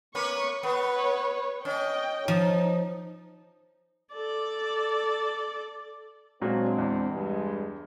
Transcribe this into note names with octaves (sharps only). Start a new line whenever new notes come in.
A#3 C#4 B4 C#6
B3 B4 C#5
C#4 D#5 G5
F3 D#4
A4 D5
A#2 F#3 G#3 C4 D4 F#4
E2
G2 G#3